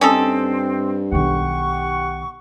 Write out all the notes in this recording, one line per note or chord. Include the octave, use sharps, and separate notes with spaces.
G2 C4 C#4 D#4 A4
B1 D#3 G4 F#5 C#6